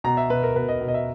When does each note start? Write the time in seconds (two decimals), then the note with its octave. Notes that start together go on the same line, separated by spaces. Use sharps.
0.04 B2 A#5
0.17 E5
0.30 B2 B4
0.43 A#4
0.56 B2 B4
0.69 D#5
0.81 B2
0.88 D#5
0.94 E5